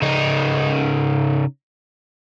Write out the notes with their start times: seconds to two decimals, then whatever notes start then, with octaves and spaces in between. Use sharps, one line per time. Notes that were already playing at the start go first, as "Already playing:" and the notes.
0.02 C#3 D#4